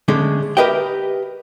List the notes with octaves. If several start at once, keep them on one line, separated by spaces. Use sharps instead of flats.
D3 G#3 A3 C#4
G4 A#4 B4 D#5 E5 G5